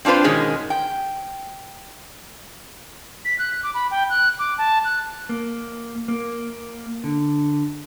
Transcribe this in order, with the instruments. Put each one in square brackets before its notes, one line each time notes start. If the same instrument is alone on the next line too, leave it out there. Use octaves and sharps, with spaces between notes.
[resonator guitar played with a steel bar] C4 D4 F4 B4 C5
G#2 B2 D#3 G#3 C#4
G5
[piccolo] B6
F#6
D6
B5
G5
F#6
D6
A5
F#6
[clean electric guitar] A#3
A#3
D3